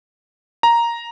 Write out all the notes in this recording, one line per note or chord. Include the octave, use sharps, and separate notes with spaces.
A#5